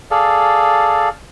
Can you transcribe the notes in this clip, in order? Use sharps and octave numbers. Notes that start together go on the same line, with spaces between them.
G#4 A4 D5 F5